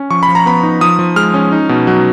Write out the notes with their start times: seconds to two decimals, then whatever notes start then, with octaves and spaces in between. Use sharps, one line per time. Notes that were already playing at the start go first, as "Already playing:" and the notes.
Already playing: C#4
0.10 F3 C#6
0.23 B5
0.28 F3
0.35 A#5
0.46 B3 B5
0.63 D#4
0.81 F3 D#6
0.99 F3
1.16 G#3 F6
1.34 C#4
1.52 D#4
1.69 B2
1.87 F#3